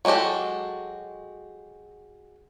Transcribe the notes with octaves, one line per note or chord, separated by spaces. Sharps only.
F#3 G#3 F#4 G4 A4